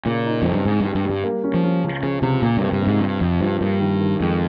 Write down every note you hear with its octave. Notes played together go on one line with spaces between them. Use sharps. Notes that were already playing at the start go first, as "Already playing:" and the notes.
A#2 C#3
D#4
F2 C4
G2
G#2 G#4
G2 G3
G2
G3
G2
A#3
C#4
F3
C#4
C#2
C#3 F3
C#2 C3
A#2 A#3
G2
C3
G2
C3
G#2
G2 F4
F2 F4
G2 F3
G2 A#3
D#3
D#3
F2 G#3